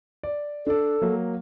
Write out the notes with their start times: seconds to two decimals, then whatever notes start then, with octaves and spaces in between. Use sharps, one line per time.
0.23 D5
0.67 D4 A4 D5
1.02 F#3 A#3